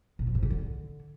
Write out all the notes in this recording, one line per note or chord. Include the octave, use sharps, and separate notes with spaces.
A#2
F3
G#2
C3
D3